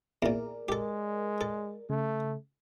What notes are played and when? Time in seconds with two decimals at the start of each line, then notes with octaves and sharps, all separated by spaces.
0.22 E2 A#2 G#4 A#4 D5
0.69 G#3 G4 A4
1.41 A4
1.90 C#3 A3